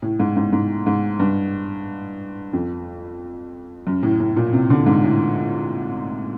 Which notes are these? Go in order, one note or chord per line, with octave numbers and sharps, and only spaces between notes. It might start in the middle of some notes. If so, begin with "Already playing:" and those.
A2
G#2
G#2
G#2
G#2
G2
F2
F#2
A2
A2
A#2
C3
D3
G#2
A2